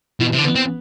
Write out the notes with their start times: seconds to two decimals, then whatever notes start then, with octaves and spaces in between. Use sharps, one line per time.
0.20 B2 E3
0.33 C3
0.38 D3
0.44 B3
0.55 C4